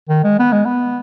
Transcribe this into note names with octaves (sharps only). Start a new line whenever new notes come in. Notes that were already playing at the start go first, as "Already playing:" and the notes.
D#3
G#3
B3
G#3
B3